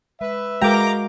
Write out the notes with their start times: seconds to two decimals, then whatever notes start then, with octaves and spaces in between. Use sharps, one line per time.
0.21 G#3 B4 E5
0.62 G#3 F#4 A#4 F5 G5 A#5 D6